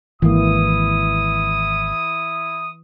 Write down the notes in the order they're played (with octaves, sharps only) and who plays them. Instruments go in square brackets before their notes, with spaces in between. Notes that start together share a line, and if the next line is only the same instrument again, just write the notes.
[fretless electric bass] G#1 A#3 [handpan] E3 [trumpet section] E4 D#6